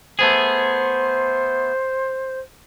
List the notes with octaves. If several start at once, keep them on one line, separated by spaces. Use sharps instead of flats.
A3 B3 G#4 C5